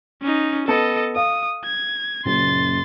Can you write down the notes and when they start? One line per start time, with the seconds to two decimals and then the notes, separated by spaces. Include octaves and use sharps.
0.22 C#4 D#4
0.68 B3 A4 D#5 A5 C#7
1.16 F5 D#6
1.65 G#6
2.25 F#1 F#2 A#2 C6 A6